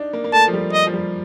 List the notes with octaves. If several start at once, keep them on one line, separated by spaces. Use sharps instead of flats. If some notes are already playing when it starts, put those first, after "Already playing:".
Already playing: D4 D#4
A#3
A#3
A3 A5
F3
G3
D#5
F3
G3